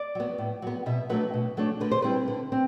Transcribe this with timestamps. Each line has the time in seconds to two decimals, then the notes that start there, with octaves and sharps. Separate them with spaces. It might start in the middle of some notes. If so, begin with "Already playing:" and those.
Already playing: D5
0.15 F#3 B3
0.38 A2
0.62 F#3 B3
0.86 B2 E5
1.10 F#3 A3 D4 B4
1.34 B2
1.57 F#3 A3 D4
1.80 D3 B4
1.92 C5
2.02 G3 C4 E4 B4
2.28 D3
2.52 C4